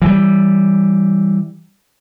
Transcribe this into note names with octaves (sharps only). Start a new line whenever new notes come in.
E3 G3